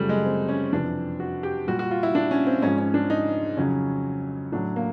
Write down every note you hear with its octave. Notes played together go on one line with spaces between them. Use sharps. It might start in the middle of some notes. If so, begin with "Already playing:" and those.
Already playing: F#2 C#3 F3 G3 A3
G#3
C4
C#4
F2 C3 E3 D4
F#4
G4
A#2 G3 F#4
F#4
F4
E4
D4
C#4
C4
G#2 F3 C#4
C#4
D4
D#4
F2 C#3 F#3 C#4
A2 F#3 D4
A#3